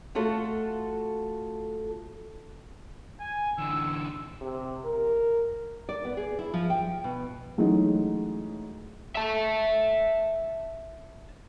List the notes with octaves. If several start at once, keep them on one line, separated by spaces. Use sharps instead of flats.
A3 F4 F#4 A4
G#5
D3 E3 E6
C3
A#4
D5
B3
G#4
E4
F3
G5
B2
E3 F#3 G#3 A3 C#4 D#4
E5 A5